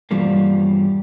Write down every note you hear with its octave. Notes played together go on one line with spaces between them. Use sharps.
E2 G2 B2 F3 G3 A#3